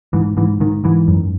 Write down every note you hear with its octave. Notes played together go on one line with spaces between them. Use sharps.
G#2 E3
G#2 E3
G#2 D#3
G#2 E3
F#2